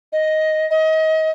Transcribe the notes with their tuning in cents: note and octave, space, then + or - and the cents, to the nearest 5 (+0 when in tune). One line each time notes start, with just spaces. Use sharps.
D#5 +5
D#5 +30